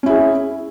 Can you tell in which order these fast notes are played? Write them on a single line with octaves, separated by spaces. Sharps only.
C#4 E4 G#4